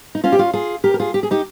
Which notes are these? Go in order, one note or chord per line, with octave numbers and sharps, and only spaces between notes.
D#4
C#4 F4
G4
C#4 F4
F4 G#4
G4 A#4
A#4
F4 G#4
G4
G#4
D#4 G4